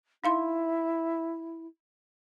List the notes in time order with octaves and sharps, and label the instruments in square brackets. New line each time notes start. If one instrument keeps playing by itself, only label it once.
[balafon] D#4 F5 C6 [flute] E4